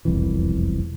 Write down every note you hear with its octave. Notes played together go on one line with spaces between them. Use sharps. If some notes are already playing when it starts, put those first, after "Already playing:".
E1 C2 F2 E3